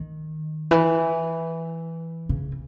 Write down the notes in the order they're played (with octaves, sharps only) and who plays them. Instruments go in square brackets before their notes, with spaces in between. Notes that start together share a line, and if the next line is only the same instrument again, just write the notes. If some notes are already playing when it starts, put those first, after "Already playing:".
Already playing: [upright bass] D#3
E3
C#3